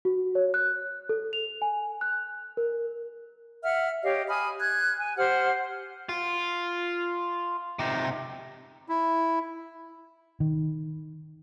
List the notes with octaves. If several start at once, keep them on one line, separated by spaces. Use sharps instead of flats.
F#4
C#5
F#6
A4
F7
G#5
F#6
A#4
E5 F#5 F6
G4 C#5 D#5 F5
G#5 B5 D#6 F6
F#6 G#6
G#5
G4 C5 F#5 F6
F4
C3 D#4
E4
D#3